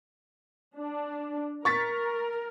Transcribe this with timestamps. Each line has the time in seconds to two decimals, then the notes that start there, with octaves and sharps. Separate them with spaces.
0.77 D4
1.65 A#4 C#6 A6 B6